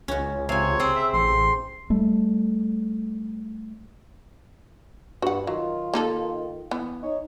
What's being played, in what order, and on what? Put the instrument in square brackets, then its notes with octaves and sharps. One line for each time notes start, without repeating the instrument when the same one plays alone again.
[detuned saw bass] C#2 [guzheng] C#4 F#4
[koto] C3 [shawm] C#5 [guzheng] F5 G#5
[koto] C4 G#4 C5
[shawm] E5
[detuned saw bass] A1 [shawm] C6
[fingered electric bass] G3 A3
[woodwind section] G2 [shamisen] F#4 F#5
[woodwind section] D#3 F4 [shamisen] F#3
[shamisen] A#3 D#4 A4
E3 B3
[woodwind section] D#4 C#5